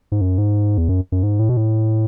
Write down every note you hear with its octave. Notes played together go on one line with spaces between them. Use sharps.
G#2
F#2
G#2
E2
F#2
F#2
G#2
A2
B2
A2